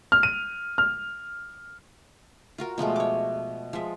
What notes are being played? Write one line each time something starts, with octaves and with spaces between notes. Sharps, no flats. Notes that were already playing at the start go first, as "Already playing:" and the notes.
F6
D#7
F6
F4 F#4 A#4
B2 F3 G#3 A3
C#5 D6
F3 G#3 E5